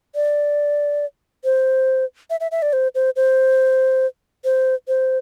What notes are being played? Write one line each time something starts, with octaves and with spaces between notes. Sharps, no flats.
D5
C5
E5
E5
E5
D5
C5
C5
C5
C5
C5